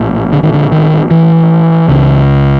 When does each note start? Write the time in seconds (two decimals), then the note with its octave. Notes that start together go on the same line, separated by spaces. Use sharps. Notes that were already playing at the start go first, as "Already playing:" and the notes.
Already playing: A#1 A2
0.32 D3
0.43 D#3
0.53 D3
0.72 D#3
1.11 E3
1.88 C#2 C#3